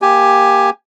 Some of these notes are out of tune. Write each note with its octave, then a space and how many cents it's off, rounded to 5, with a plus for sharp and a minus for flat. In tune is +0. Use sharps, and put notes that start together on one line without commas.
A#3 +0 G4 +10 G#5 +0